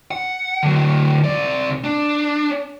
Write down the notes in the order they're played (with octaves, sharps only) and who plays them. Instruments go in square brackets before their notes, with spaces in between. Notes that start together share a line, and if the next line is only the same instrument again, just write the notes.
[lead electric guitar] F#5
D3 F#3
C3 D5
D4